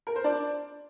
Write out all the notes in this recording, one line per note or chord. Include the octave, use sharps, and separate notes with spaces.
A#4
C5
D4 D5